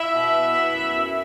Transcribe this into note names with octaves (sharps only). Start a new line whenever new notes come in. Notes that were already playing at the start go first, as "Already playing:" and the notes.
Already playing: E4 E5
B2
B3
B3
F#2
F#2